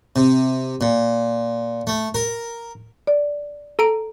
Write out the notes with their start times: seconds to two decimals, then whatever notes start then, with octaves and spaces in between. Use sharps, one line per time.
0.16 C3
0.81 A#2
1.87 A3
2.15 A#4
3.07 D5
3.79 A4 A#5 D7